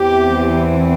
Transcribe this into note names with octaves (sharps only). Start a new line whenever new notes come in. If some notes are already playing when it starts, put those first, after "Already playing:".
Already playing: E2 E3 C4 G4